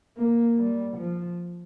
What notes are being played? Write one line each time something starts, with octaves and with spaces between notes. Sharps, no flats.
A#3
G3
F3